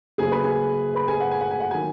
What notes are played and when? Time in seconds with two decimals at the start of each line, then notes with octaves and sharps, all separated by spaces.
0.18 F#1 F#2 C#3 F#3 G#4 G#5
0.31 B4 B5
0.44 G#4 G#5
0.95 B4 B5
1.08 G#4 G#5
1.20 F#5
1.31 G#5
1.41 F#5
1.51 G#5
1.60 F#5
1.71 D#3 F#3 G#5